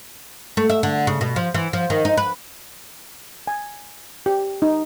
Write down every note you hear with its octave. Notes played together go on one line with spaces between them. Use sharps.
A3
E5
D3
C#3
B2
F3
E3
F3
D#3
D#4
B4
G#5
G4
D#4